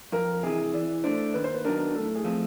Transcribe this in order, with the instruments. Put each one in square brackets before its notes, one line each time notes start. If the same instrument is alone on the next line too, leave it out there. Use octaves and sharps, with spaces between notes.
[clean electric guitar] F2 [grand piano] A#4
[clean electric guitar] C3 E3 [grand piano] G#4
[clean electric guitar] E3 [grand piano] D5
[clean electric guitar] A3 D4 [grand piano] C5
[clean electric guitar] D#2 [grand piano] B4
[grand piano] C5
B4
[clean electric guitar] D#3 F#3 B3 D4 [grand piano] A#4
[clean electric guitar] A2 [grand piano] A4
[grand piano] G#4
[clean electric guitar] F3 A3 C4